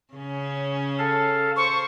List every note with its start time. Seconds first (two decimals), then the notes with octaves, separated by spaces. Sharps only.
0.14 C#3 C#4
0.98 A4 F5 A5
1.57 C5 C#6